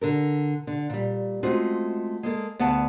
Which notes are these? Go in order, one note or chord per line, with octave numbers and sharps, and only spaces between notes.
D3 A4 A#4
D3
A#2 G3
G#3 A3 C4 C#4 F4 F#4
G#3 A#3 A4
D2 B3 F5 F#5 A5